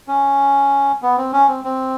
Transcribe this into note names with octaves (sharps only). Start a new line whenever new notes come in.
C#4
B3
C4
C#4
C4
C4